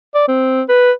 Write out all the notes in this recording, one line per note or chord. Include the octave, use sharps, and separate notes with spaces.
D5
C4
B4